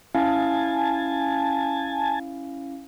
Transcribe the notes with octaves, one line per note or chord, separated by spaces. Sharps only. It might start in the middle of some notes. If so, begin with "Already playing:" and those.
C#4 E4 F5 G#5 A5